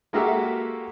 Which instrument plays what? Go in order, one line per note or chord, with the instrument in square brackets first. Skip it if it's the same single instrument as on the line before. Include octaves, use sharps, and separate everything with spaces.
[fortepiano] G#3 A#3 F#4 G4 A4 E5